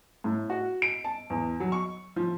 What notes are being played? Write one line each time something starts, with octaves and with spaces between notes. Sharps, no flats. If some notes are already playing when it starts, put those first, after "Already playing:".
A2
F#4
D7
A5
E2
F#3
C#6
F3